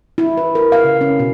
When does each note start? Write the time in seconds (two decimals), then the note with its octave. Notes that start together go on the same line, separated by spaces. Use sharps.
0.18 E4
0.37 B4
0.55 A#4
0.72 F5
0.84 C#3
1.01 C#4
1.19 B2